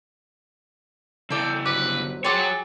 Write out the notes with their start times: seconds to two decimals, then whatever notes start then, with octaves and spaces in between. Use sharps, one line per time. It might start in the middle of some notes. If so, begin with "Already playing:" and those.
1.30 C#3 E4 A4 D5 G5
1.65 G1 F#3 B4 C5 D6
2.24 F#4 G#4 A4 C#5 G5 G#5 C6 D6